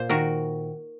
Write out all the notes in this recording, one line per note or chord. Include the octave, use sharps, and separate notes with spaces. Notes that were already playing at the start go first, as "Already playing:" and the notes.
Already playing: A#2 C5
D#3 F#4 A#4